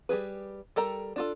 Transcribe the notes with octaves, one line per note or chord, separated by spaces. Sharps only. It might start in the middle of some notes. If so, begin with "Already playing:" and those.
G3 G4 G#4 B4
G3 A4 A#4 G5 A#5
D4 F4 A4